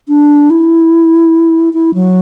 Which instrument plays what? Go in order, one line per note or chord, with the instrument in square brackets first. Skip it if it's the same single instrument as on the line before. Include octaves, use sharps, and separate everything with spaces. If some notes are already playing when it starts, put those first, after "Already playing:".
[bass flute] D4
E4
E4
F#3